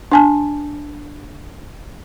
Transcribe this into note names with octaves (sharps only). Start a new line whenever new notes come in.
D4 G#5 A5